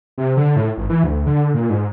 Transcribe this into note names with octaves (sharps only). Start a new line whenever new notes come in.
C3
D3
A2
G#1
E3
D2
D3
A#2
G#2